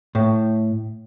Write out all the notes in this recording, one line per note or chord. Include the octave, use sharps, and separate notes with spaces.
A2